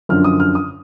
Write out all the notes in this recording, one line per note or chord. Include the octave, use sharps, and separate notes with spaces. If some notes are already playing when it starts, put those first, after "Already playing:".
F#2 D3 F3 F6
D#6
F6
D#6